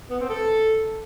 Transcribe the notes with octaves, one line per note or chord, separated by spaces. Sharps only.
B3
C4
A4